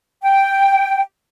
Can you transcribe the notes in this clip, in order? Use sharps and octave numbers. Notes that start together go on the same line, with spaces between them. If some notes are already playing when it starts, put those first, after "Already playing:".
G5